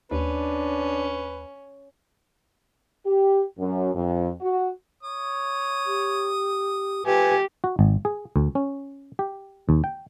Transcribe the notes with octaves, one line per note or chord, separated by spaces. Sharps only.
D#2 C#4 D4 B4
G4
F#2
F2
F#4
C#5 D#6
G4
F3 A3 G4 B4 G#5
F#4
G#1
G#4
D2
C#4
G4
D#2
G5